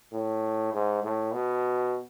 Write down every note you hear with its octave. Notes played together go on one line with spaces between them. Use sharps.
A2
G#2
A2
B2